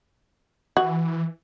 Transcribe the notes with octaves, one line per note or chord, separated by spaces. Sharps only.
E3 F#4